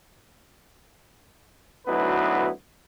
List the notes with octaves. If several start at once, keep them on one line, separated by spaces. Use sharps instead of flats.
D2 F#3 B3 D#4 E4 B4